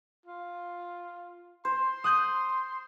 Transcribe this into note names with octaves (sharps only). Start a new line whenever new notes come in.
F4
C5 C6
D#6 F#6 G6